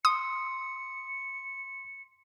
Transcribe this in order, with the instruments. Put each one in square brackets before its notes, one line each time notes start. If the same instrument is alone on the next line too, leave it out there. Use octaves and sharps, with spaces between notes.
[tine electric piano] C6 [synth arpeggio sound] D#6 [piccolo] C#7